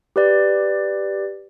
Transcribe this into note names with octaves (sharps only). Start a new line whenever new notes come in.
G4 B4 D5